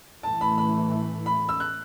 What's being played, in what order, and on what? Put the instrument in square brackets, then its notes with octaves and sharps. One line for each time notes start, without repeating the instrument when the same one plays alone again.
[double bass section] A2 E3 A3 [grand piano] A5
[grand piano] B5
B5
B5
E6
F#6